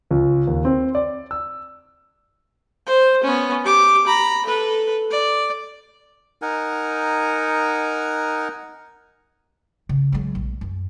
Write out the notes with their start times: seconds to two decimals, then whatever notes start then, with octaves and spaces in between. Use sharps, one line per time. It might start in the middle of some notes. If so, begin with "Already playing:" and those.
0.11 C#2
0.47 D#2
0.65 C4
0.95 D5
1.31 E6
2.86 C5
3.24 B3 C#4
3.64 G4 D6
4.07 A#5 B5
4.46 A4 B4
5.10 D5
6.42 D#4 A#4 F#5 G#5
9.89 C#3
10.12 F#3 G#3
10.35 A#1
10.61 F#2